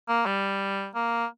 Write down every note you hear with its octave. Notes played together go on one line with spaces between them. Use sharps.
A#3
G3
A#3